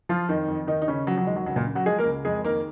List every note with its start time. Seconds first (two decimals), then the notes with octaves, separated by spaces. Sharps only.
0.09 F3 F4
0.29 F2 D#3 D#4
0.48 F2
0.67 D#2 D#3 D#4
0.82 D#4
0.88 C#3 C#4
1.07 F3 F#3
1.17 F#3
1.27 D#2 G#3
1.36 F#3
1.46 C#2 F#3
1.56 A#2 A#3
1.66 C#3
1.75 F#3 F#4
1.86 F3 G#3 G#4
1.99 A#3 A#4
2.05 C#2
2.25 F2 G#3 G#4
2.44 D#3 A#3 A#4